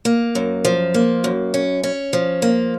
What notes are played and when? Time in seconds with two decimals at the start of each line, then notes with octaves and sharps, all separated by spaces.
0.05 A#3
0.35 F#2
0.65 F3
0.94 A#3
1.24 F#2
1.54 C#4
1.83 C#4
2.13 F3
2.42 A#3